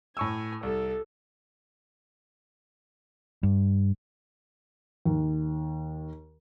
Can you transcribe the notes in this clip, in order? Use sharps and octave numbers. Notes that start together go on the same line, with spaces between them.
A2 G#5 C#6 E6
C2 A4
G2
D#2